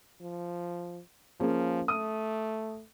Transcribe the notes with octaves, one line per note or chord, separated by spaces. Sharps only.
F3
F3 A#3 C#4 G#4
A3 D#6 D#7